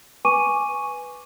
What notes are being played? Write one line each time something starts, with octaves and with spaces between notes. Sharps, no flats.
B4 G#5 C#6 D6 D#7